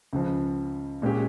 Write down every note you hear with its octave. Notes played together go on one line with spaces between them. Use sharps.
C#2 C#3 F3
A#2 G#3 C#4 G4